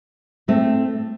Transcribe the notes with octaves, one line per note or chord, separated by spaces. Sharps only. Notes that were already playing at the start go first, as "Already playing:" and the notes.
A2 A3 C4